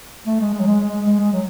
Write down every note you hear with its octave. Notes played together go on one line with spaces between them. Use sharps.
A3
G#3
G#3
F#3
G#3
G#3
G#3
G#3
F#3